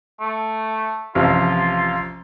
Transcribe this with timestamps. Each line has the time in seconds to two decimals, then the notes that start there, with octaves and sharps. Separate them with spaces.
0.21 A3
1.15 A1 C3 F3 F4